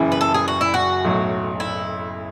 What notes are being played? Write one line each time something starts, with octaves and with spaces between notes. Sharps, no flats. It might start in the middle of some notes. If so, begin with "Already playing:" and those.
Already playing: F#1 F#2 E3
B4
A4
G#4
F#4
E4
F#4
B1 A2 F#3
E4